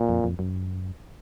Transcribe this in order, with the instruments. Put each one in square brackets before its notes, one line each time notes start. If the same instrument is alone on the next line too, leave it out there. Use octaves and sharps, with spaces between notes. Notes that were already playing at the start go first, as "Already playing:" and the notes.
Already playing: [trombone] A#2
[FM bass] F2
F2
F#2